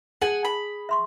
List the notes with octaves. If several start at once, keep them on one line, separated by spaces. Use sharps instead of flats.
G#4 F#5 G#5
B5
E5 C6 C#6